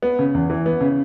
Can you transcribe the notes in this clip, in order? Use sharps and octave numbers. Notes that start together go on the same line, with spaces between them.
B3
C#3
E2
E3
B3
C#3